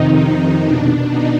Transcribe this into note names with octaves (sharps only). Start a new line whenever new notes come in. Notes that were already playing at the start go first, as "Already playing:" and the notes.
Already playing: F2 C3 D#3 D#4
D#4
B2 D4
D#4